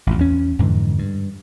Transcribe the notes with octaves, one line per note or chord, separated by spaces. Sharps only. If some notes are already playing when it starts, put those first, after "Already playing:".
A1 F2
E2 C#4
F2 G#2 D3 E3
G2